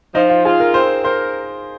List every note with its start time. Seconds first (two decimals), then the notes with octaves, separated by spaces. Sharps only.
0.14 F3 D#4
0.30 F4
0.45 F4 G#4
0.60 A#4
0.74 C4 C5
1.04 A#4 C5